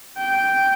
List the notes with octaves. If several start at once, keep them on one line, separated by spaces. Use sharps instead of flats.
G5